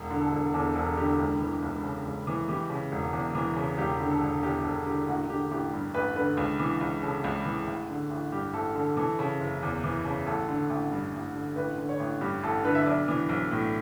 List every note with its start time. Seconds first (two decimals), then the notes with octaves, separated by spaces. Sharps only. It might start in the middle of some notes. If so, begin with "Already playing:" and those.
Already playing: E1
0.10 D3
0.21 A4
0.32 E1
0.54 E2 A4
0.75 E1 A4
0.97 D3 G4
1.19 C#2
1.41 E3
1.62 C#2
1.84 C#3
2.05 C#2
2.27 E3
2.49 E3 G4
2.70 C#3
2.92 E1
3.13 E2
3.35 E3
3.56 C#3
3.78 E1 G4
4.00 D3
4.10 A4
4.21 E1
4.43 E2 G4
4.64 E1 A4
4.86 D3 G4
5.08 A1 F#4
5.29 D3 G4
5.51 A1 G4
5.73 G2
5.94 A1 B4
6.16 D3 B4
6.37 C#2
6.59 E3
6.81 C#2
7.03 C#3 A4
7.24 C#2
7.45 E3
7.67 A1
7.89 D3
8.10 A1
8.32 G2 G4
8.53 A1 A4
8.75 D3 A4
8.97 E3 A4
9.19 C#3
9.40 F#1
9.63 E2
9.84 E3
10.05 C#3
10.26 A1 A4
10.48 D3
10.70 A1
10.92 G2
11.13 A1
11.36 D3
11.56 A1 B4
11.78 D3
11.89 C#5
12.00 A1
12.21 G2 G4
12.43 A1 A4
12.64 D3 B4
12.75 E5
12.86 B1 D5
13.08 E3
13.29 B1
13.51 A2